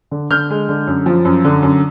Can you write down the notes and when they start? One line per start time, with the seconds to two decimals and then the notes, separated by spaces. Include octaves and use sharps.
0.11 D3
0.30 D3 F6 G6
0.50 G#3
0.69 D3
0.87 F#2
1.06 F3
1.25 F#2
1.45 D3
1.63 F#2